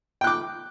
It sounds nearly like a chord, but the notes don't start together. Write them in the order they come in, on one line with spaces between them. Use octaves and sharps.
G5 F#6 D6